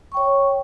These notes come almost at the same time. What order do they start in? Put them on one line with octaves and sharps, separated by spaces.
C#6 G5 C#5